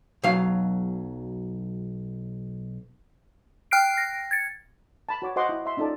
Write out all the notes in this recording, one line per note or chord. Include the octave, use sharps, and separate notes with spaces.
B1 F#3 F5
G5 F6 F#6 C7 D7
A#6
G#6 A6 C#7
A5 B5
F#4 C#5 D6
F#4 C5 D#5 F#5 C6 D6
E4
E5 C6
C#4 D#4 F4 A4 D5 A5